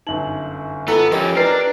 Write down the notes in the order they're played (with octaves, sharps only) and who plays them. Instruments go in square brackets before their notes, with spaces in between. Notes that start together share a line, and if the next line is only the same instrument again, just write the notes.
[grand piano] G1 F#2 F#7 [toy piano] D#4
[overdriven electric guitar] B3 [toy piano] E4 F4 [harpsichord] A4
[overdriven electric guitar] F3 C#4 [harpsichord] G4 [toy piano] A#4 D#5
[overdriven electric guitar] D4 [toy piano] E4 B4 [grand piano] A#4 C7